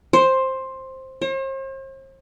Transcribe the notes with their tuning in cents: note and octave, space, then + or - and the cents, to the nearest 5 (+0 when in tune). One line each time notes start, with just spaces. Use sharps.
C5 +10
C5 +45